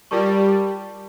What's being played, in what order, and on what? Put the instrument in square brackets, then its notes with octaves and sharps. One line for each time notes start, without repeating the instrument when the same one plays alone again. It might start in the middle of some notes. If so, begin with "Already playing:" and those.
[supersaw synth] G3 [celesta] F4 A#4 D5 A5 C#6